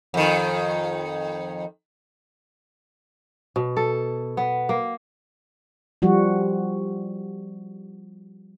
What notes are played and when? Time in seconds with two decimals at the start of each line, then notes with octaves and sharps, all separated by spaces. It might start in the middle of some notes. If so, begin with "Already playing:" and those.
0.14 F2 D#3
3.56 B2
3.77 A4
4.37 B3
4.69 A#3
6.02 F3 G3 F#4